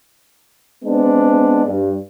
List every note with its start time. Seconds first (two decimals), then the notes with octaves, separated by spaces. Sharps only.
0.84 G#3 B3 C4 D4
1.66 G2